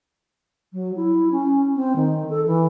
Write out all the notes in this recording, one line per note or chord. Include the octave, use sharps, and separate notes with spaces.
F#3
E4
C#4
C4
D#3
A4
E3